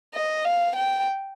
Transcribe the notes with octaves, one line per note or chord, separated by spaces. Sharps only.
D#5
F5
G5